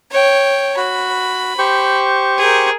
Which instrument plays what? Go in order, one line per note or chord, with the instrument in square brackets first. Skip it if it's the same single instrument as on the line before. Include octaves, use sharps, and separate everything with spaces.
[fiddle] C#5 G5
[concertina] F#4 [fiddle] B5
[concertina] G4 C5 C#6
[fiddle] G#4 A#4